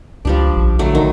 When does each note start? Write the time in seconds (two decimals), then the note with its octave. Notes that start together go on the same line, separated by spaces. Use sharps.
0.25 C#2 F3 G3 D4
0.57 A#1
0.79 D3 F#3 A3
0.95 D#3